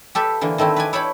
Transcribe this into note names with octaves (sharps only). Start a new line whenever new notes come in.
G4 A4 B4 E5
D3 E3 A#3
D#3 A3 C4 E4
B4 D5 G#5
E4 C#5 G5 A5 B5